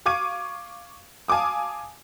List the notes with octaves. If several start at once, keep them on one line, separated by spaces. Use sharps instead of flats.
F5 C#6 D6 G#6 D#7
F5 G#5 A5 D6 D#6